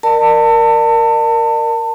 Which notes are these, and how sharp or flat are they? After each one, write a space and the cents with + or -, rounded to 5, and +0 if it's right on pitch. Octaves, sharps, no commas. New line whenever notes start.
A#4 +0 D5 +40 A5 +30